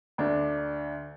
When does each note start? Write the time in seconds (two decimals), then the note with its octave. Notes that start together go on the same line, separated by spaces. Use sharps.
0.18 D2 D4